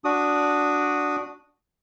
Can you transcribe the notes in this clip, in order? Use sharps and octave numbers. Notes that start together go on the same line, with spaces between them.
D4 F#4 D#6